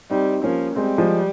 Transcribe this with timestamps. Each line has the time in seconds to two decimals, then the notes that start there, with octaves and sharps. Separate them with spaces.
0.11 G3 C4 D#4
0.44 F3 A#3 C#4
0.76 G3 G#3 C4
0.98 F3 G#3